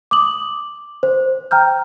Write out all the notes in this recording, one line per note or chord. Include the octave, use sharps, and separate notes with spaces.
D6 D#6 F#7
C5
G5 A#5 F6 G6